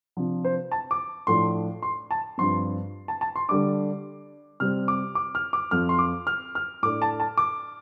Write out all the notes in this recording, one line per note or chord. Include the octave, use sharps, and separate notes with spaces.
C3 F3 D4
C5
A5
D6
A2 F3 A3 D4 C6
C6
A5
G2 F3 C4 C6
A5
A5
C6
D3 G3 D4 D6
C3 G3 C4 F6
D6
D6
F6
D6
F2 F3 C4 F6
C6
D6
F6
F6
A2 A3 D4 D6
A5
A5
D6